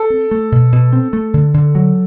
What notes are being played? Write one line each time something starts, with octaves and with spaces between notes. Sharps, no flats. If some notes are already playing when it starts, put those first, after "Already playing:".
Already playing: A4
C4
A3
B2
B2
C4
A3
D3
D3
F#3